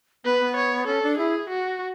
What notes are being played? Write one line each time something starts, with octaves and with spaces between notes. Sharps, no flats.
B3 B4
B3
C#5
C#4 A4
D4
E4 G#4
F#4